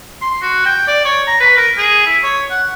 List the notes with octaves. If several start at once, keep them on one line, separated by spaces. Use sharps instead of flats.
C6
F#4
G5
D5
C#5
A#5
B4
A#4
G#4
E4
C#5
F#5